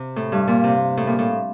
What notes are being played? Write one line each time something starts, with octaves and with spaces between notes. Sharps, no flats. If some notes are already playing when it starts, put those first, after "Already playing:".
Already playing: C3
A2
G2
A#2
C3
A2
A#2
A2